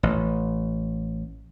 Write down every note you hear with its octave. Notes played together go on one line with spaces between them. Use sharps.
A1